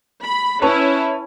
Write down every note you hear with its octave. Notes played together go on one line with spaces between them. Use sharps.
B5
C#4 E4 B4 C#5 A5